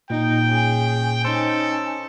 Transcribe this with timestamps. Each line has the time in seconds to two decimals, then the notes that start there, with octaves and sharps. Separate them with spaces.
0.10 A#2 D#4 G5
0.48 C#4 G#4
1.25 C#4 D#4 A4 C5